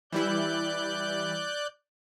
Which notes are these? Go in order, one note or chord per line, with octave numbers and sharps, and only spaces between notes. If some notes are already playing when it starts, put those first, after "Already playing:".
E3 G3 E4 D5 F#6 G6